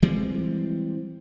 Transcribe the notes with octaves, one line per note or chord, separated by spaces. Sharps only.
E3 G3 G#3 C4